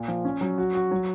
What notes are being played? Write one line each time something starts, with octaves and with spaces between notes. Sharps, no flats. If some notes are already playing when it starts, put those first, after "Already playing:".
Already playing: A#2
F3
C#4
F#3
F#4
F#4
F#3